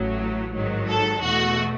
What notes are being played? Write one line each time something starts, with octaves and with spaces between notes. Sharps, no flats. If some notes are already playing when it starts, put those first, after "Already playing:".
Already playing: A1 A2 F#3 A3
G#2 D#3 F#3
A4
E2 B2 A3 F#4